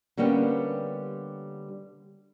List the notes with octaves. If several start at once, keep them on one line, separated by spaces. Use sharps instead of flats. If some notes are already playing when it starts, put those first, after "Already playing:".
D3 G3 A#3 B3 C#4 G4